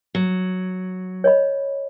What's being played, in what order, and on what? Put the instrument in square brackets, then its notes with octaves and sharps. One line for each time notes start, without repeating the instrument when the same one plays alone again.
[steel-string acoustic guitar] F#3
[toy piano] C#5 D#5 B5